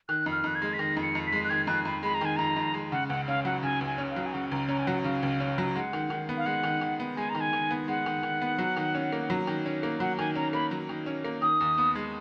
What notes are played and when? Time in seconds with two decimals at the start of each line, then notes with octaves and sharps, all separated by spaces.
0.09 D#3 F#6
0.26 F2
0.31 F6
0.44 F2 F#6
0.55 G#6
0.62 G#3
0.73 B6
0.79 D#3 A#6
0.97 F2
1.02 C#7
1.15 F2
1.27 B6
1.32 G#3
1.44 F#6
1.49 D#3 G#6
1.67 F2 F#6
1.85 F2 B5
2.03 G#3 B5
2.15 A#5
2.21 D#3 G#5
2.37 F2 A#5
2.56 F2
2.74 G#3
2.92 C#3 F#5
3.09 C#2 F#5
3.28 C#4 F5
3.45 F#3 F#5
3.63 C#3 G#5
3.81 C#2
3.86 G#5
3.98 C#4
4.11 F5
4.16 F#3
4.26 G#5
4.33 C#3 F#5
4.52 C#2 A#5
4.69 C#4 A#5
4.79 G#5
4.87 F#3 F#5
5.04 C#3 F5
5.23 C#2
5.40 C#4
5.58 F#3
5.75 G#3 F#5
5.93 D#3
6.10 D#3
6.29 B3
6.37 F5
6.46 G#3 F#5
6.64 D#3
6.81 D#3
7.00 B3
7.17 G#3 G#5
7.30 A#5
7.35 D#3
7.41 G#5
7.53 D#3
7.71 B3
7.88 G#3 F#5
8.06 D#3
8.23 D#3
8.42 B3
8.58 F#3
8.77 D#3
8.95 C#4
9.13 A#3
9.30 F#3
9.47 D#3
9.66 C#4
9.83 A#3
10.00 F#3 F#5
10.18 D#3 G#5
10.35 C#4 A#5
10.53 A#3 B5
10.71 F#3
10.89 D#3
11.06 C#4
11.25 A#3
11.42 D#3 D#6
11.60 D#2
11.78 B3
11.95 G#3